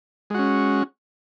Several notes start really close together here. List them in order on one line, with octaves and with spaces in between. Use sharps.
G#3 F#4 C#4